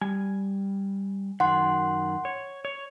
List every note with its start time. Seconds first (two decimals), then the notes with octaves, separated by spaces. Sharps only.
0.01 G3 G#5
1.40 F#2 D#3 F#5 C6
2.25 C#5
2.65 C#5